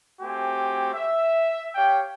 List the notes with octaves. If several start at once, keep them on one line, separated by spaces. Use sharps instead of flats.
A3 C4 F#4 G4 G#5
E5
G4 C#5 F5 G5